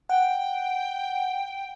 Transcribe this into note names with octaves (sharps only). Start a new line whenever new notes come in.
F#5 G5